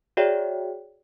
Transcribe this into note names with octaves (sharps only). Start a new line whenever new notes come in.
F#4 G#4 C#5 D5 E5 G5